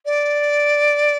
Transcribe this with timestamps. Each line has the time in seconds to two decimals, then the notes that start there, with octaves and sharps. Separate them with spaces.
0.05 D5